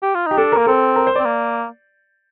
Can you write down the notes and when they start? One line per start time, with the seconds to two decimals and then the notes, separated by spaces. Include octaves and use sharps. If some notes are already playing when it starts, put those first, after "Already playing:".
0.03 G4
0.15 F4
0.27 D#4 G4
0.37 D4 A4
0.52 A#3 A#4
0.67 C4 A4
0.96 A#4
1.07 C5
1.16 C4 D5
1.25 A#3